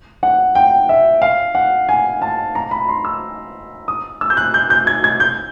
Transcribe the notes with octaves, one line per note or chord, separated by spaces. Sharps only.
F#5
G5
E5
F5
F#5
G#5
A5
A#5
B5
C6
E6
D#6
E6
G6
F#6
G6
G6
G#6
G#6
G6